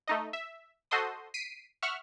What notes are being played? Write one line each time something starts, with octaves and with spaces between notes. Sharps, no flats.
A3 D#4 D#5
E5
F#4 A4 C5 D#5 C6 D#6
B6 C7 D7 D#7
E5 F#5 C#6 F6